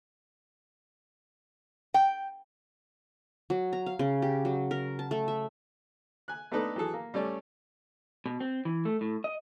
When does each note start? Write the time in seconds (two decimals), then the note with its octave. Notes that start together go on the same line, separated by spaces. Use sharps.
1.94 G5
3.50 F#3
3.73 A#5
3.86 F5
3.99 C#3
4.22 G4
4.45 F#3
4.71 A#4
4.99 A5
5.11 A3
5.28 E5
6.28 G#5 F#6
6.52 A3 B3 D4 D#4 A4 B4
6.76 E3 F#3 G#4 A4
6.93 A#3
7.14 G3 A3 C#4 D5
8.26 B2
8.40 C4
8.65 E3
8.85 A3
9.01 A2
9.24 D#5